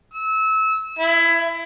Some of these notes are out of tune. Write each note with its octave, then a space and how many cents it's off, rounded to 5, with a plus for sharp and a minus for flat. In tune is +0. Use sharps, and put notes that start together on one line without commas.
E6 -25
E4 +20